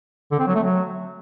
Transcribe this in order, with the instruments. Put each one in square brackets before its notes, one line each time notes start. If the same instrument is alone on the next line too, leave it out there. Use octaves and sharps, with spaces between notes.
[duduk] D3
C4
F#3
A3
F#3